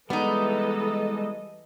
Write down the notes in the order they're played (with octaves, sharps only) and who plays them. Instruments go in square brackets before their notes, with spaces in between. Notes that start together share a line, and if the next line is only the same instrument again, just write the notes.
[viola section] E3 A4 D#5 [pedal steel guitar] G3 G#3 [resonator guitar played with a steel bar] B3 D#4